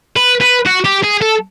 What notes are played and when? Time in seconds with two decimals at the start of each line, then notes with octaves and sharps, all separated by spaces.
0.16 B4
0.41 B4
0.66 F#4
0.85 G4
1.04 G#4
1.22 A4